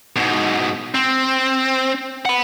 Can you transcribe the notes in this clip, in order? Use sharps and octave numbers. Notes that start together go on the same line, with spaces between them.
G#2 B2
C4
F#5 B5